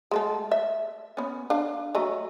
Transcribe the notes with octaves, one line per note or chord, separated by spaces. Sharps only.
G#3 A3 A4
E5
B3 C#4
D4 F5
F#3 A3 D#5